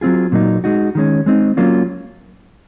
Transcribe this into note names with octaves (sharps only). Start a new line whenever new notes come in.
F#3 C4 F4 G#4
A#2 F#3 A#3 D#4
G#3 D#4 F#4
D#3 G#3 C#4
G#3 C4 D#4
F#3 A#3 C#4 F4